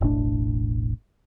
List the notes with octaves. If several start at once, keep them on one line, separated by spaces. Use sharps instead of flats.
E1 A1 A2 D4